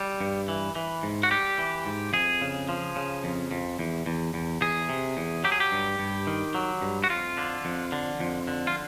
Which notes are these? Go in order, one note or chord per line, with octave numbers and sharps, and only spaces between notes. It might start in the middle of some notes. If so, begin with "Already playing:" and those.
Already playing: G3
G2
E3
E3
G#2
F#4
G3 G4
E3
G#2
F2 G#4
C#3
F3
C#3
F2
F2
E2
E2
E2
E2 G#4
C3
E2
F#3 G4
G#4
G4
G2
G2
D#3
F#3
G2
F#4
F2 F4
D3
F2
D3
F2
D3
F4